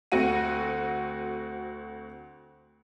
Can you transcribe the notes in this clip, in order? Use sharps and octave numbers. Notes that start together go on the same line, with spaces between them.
D2 C4 F#4 F#5 D#7